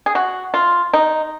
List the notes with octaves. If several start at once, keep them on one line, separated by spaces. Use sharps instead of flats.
G#4
F#4
F4
D#4